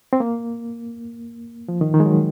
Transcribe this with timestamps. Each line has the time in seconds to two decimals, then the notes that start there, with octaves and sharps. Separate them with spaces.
0.13 C4
0.20 A#3
1.68 F3
1.81 D#3
1.94 D#3
2.00 G#3
2.06 F#3